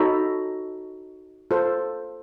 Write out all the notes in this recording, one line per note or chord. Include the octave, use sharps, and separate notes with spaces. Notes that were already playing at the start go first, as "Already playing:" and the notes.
Already playing: D#4 F#4 A4 C#5 B5
F4 A4 C5